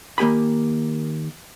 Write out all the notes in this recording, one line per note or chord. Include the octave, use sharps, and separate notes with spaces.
D#3 A#3 G4 G#5 B5